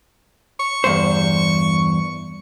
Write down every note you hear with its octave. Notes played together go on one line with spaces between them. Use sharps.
C#6
E2 G2 C5